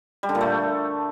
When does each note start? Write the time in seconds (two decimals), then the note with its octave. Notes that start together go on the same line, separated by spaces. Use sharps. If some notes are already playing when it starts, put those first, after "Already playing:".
0.23 G3
0.29 D3
0.35 A#2
0.41 A3